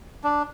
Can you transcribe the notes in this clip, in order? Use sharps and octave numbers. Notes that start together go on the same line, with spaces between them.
D4